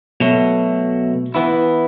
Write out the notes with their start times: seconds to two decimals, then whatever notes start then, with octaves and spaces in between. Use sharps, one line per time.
0.20 B2 F#3 A3
1.34 E3 B3 E4